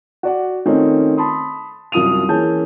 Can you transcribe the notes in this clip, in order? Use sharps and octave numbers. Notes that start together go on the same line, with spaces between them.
F#4 D5 F#5
D#3 A3 C4 C#4 D#4 F4
A5 B5 C6 D#6
C2 F#2 F4 D#6 D#7 F7
E3 A#3 C#4 G#4 A5 G6